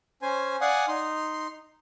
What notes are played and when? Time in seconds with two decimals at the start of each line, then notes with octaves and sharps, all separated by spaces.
0.22 C#4 C5 G#5
0.61 D5 F5 F#5 G#5 D#6
0.88 D#4 C6